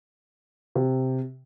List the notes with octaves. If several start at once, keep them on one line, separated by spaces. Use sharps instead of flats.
C3